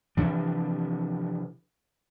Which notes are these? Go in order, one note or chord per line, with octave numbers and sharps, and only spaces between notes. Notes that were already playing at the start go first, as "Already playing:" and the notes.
C3 E3 F3 D4